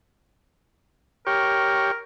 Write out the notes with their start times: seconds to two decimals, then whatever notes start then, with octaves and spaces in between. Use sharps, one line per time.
1.27 G4 A#4 C#5